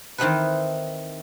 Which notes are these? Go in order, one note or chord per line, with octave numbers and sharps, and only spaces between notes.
D#3 E3 C4 D#4 A4 B4